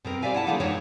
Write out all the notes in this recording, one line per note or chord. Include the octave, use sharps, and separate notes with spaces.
B2 C4 A#4
G4 C5 D5 E5 F5 G#5
E4 F#5 A5
D#3 F3 A3 A#3 D4 G#4
D#3 E3 F#3 G#3 D#4 C#5